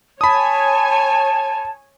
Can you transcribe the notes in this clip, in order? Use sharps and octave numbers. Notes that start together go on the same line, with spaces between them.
C#5 G#5 A5 B5 D#6